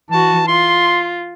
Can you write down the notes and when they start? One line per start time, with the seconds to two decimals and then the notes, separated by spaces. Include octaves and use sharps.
0.10 E3 F#4 A5
0.48 F4 C6